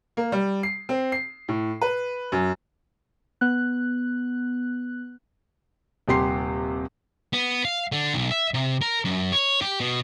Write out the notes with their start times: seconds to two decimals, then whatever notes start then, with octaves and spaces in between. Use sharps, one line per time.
0.17 A#3
0.32 G3
0.63 C7
0.89 C4
1.12 C7
1.48 A2
1.81 B4
2.32 F#2
3.41 B3 F#6
6.08 D#1 C3 G4 C6 C7
7.33 B3
7.65 F5
7.92 D3
8.14 B1
8.31 E5
8.54 C3
8.81 A#4
9.05 F#2
9.32 C#5
9.61 G4
9.80 B2